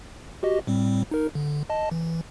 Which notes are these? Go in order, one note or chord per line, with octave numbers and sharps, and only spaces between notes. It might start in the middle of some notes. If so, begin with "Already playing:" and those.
F#4 G4 D#5
A2 G3 C4
D#4 A#4
D3
D#5 A5
E3